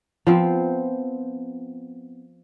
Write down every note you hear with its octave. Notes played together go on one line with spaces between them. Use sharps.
F3 B3 C4